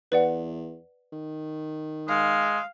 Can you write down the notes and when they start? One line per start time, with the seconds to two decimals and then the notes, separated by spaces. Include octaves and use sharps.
0.12 E2 B4 D5 F#5
1.12 D#3
2.08 G#3 F5